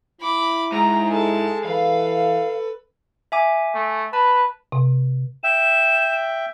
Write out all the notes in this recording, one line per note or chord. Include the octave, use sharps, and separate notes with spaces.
E4 B5 D6
G#2 A#5
G#3 A4 A5
E3 A4 B4 F5
E5 G#5 D6
A3
B4 A5
C3
E5 G5 E7